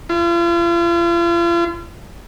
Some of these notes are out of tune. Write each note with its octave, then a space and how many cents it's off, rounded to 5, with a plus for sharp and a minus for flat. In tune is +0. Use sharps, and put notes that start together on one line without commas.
F4 -40